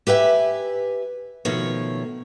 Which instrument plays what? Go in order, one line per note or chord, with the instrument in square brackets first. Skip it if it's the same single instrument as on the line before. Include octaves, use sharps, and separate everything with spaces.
[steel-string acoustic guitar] G4 B4 E5 G5 G#5
B2 D#3 F3 A3 C#5